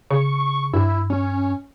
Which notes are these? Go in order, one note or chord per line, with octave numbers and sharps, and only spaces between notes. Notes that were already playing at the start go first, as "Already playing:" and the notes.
C#3 C#6
G2 E4
C#4